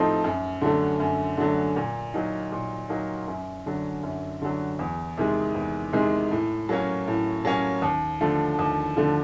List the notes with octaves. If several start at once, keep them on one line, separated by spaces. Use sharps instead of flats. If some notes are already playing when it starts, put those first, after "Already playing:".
Already playing: A2 F3 A3 C4 D#4
F#2
D3 F#3 A3
F#2
D3 F#3 A3
A#2
F#3 A#3 D#4
A#2
F#3 A#3 D#4
F#2
D3 F#3
F#2
D3 F#3
E2
C3 D#3 G#3
E2
C3 D#3 G#3
A2
F#3 A#3 C#4
A2
F#3 A#3 C#4
D#2
D3 F3 A3
D#2
D3 F3 A3